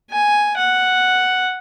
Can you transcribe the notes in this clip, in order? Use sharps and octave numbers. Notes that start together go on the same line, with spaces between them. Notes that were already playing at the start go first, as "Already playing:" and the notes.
G#5
F#5